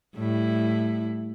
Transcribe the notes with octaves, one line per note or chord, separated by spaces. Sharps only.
A2 G3 E4